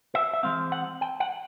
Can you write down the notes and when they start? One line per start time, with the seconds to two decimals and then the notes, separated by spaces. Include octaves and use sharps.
0.15 E5
0.33 E5
0.43 E3 G#3 C4 F5
0.72 F#5
1.01 G5
1.20 F#5